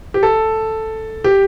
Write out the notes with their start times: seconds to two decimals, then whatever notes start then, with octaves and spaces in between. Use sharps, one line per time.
0.14 G4
0.23 A4
1.24 G4